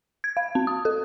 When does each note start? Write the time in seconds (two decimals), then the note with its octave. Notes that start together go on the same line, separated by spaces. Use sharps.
0.24 G#6
0.37 F5
0.55 C4
0.67 D#6
0.85 A4